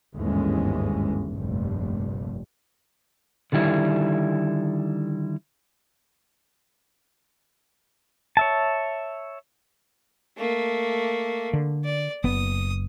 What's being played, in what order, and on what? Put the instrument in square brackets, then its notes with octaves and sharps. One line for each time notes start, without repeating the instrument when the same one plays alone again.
[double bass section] G1 D#2 G#2 E3 G#3 C#4
F1 A#1 G2
[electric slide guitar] D3 D#3 G3 E4
[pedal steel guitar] C#5 E5 A5
[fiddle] A3 A#3
[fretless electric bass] D3
[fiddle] D5
[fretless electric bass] F#1 B3 [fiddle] D#6